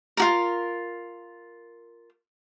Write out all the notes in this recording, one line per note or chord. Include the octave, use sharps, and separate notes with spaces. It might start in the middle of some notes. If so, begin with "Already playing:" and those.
F4 F#4 A#4